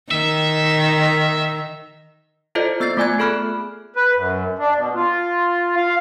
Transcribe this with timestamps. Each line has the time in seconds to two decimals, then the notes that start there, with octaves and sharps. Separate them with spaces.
0.11 D#3 E5
2.55 E4 F4 A4 C5 D5 D#5
2.80 B3 E6 G6 A6 C7
2.97 A3 F4 D5 G#5 F#6 G#6
3.18 B3 G#4 A4 B5 F6 F#6
3.96 B4
4.15 F#2
4.58 D4
4.76 B2
4.95 F4
5.76 F5